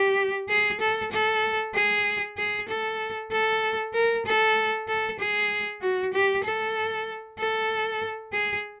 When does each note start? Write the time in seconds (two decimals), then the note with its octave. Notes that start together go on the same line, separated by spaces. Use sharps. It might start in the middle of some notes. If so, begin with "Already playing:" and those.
Already playing: G4
0.49 G#4
0.80 A4
1.12 A4
1.75 G#4
2.38 G#4
2.68 A4
3.32 A4
3.94 A#4
4.26 A4
4.88 A4
5.19 G#4
5.82 F#4
6.13 G4
6.44 A4
7.39 A4
8.33 G#4